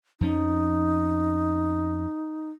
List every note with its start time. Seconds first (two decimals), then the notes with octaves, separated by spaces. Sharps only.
0.21 F2 F3 C#4 D#4